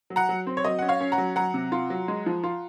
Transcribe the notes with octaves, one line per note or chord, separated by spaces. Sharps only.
F#3
F#5 A#5
F#3
C4
C#5
F#3 D#5
C#4 F#5
C#5 F5
C#4
F#5 A#5
F#3
F#3 F#5 A#5
C3
F4
F#3
G#3
F3
F4